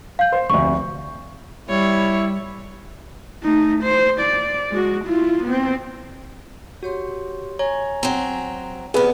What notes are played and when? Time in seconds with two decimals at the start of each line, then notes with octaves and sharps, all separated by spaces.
0.19 F5 G6
0.32 C5
0.50 F1 D2 C#6
1.69 G3 E4 C#5
3.44 A3 D#4
3.83 C5
4.20 D5
4.72 G#3 F#4
5.05 E4 F4
5.44 B3 C4
6.83 F#4 G4 C#5 C6
7.59 C#5 G#5 A#5
8.03 F#3 C4 A#5
8.94 C3 B3 G#4 B4 D5 F#5